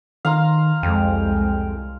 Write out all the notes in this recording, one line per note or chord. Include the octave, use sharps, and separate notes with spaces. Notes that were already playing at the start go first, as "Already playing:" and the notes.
D#3 F5 A#5 C6
C2 F2 G#3 G5